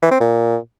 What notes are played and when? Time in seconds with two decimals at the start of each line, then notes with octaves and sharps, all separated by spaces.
0.02 E3
0.11 C4
0.20 A#2